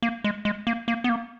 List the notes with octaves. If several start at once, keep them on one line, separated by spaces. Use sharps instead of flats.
A#3
G#3
G#3
A#3
A#3
B3
A#3